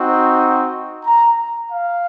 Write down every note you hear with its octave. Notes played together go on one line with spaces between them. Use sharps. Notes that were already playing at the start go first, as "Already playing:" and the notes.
Already playing: C4 D#4 F#4
A#5
F5